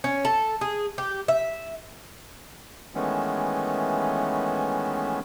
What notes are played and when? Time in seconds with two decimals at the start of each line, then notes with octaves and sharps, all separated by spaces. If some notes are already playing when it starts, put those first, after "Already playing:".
0.04 C#4
0.25 A4
0.61 G#4
0.98 G4
1.28 E5
2.95 D#3 E3 G#3 A3 B3 C#4